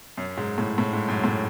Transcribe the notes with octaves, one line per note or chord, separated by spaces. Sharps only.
F#2
G#2
A2
A2
G#2
F#2
A2